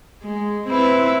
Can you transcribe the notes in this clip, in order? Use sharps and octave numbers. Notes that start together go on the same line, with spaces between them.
G#3
C4 E4 B4